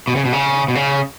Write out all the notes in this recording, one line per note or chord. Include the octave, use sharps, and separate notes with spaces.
B2
C#3
B2
C#3
B2
C#3